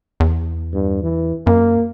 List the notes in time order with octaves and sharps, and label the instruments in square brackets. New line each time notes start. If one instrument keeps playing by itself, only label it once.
[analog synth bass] E2
[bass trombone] G2
E3
[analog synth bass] F#2 [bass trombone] A#3